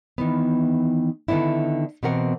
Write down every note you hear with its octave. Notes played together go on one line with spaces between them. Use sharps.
D#3 E3 B3
D3 D#3 B3 D4 E4
B2 E3 C4 A#4 F#5